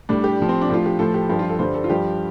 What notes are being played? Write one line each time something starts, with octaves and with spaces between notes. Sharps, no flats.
A2 G3 D4
G4
A2 F3
C4
D4
A2 F3 F4
G4
A2 F3 A4
G4
G2 F3 G4
F4
A4
G2 D3 G3 C5
A4
F4
G2 F3 G4